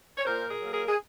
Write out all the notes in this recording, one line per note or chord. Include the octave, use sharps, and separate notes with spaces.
C#5
A#2 A#4 C5
G#4 A#4
F#3 A#3
G#4 A#4
G#4